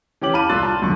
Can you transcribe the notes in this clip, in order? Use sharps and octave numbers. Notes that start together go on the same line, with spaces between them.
E3 C#4 G4 D6 F#7
F5 A5 B5 D6 F6 D#7
C2 F4 C6 E6 F#6 A6
A5
C2 F#2 D3 C#6